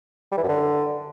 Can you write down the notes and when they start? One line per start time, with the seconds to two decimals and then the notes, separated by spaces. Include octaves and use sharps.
0.32 G3
0.38 E3
0.43 F#2
0.49 D3